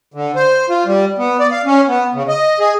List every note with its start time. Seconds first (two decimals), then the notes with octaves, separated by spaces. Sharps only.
0.14 D3
0.36 C5
0.70 F4
0.85 G3
1.18 B3
1.39 D5
1.51 F5
1.65 C#4
1.88 B3
2.14 C#3
2.28 D#5
2.60 G#4